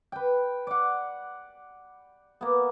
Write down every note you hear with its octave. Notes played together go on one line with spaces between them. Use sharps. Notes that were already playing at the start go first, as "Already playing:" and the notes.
B4 G5
D5 F#5
A#3 B3